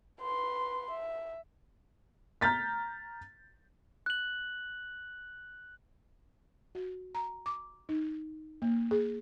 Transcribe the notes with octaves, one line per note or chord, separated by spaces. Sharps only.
B4 C6
E5
A#5 F6 G6 A6 B6
F#6 F#7
F#4
A#5
D6
D#4
A#3
G#4